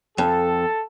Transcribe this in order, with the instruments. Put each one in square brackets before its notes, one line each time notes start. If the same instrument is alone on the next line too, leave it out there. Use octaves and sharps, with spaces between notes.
[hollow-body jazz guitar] F2 [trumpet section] A4